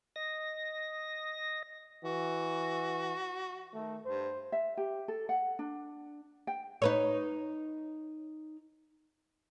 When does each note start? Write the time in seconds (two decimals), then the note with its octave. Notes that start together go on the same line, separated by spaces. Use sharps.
0.16 D#5 A#6
2.04 E3 F#4
3.74 D#3 A3
4.06 G2 C5
4.52 E5
4.77 G4
5.08 A4
5.29 F#5
5.59 D4
6.47 G5
6.82 D#4 B4 C#5